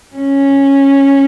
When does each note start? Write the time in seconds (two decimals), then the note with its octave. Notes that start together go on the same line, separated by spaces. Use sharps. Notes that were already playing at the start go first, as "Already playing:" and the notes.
0.16 C#4